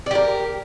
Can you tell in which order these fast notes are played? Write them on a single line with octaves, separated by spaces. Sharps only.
D5 G4 A#4